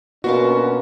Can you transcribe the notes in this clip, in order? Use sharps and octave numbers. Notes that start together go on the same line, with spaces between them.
B2 A#3 C#4 D4 F4 F#4 A5